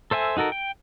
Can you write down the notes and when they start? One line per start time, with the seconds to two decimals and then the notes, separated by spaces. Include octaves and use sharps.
0.11 A4 C5 E5 G#5
0.37 D#4 F#4 A4 A#4
0.52 G5